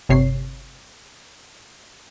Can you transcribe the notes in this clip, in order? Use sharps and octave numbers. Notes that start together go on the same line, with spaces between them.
G1 C3 C#5 C7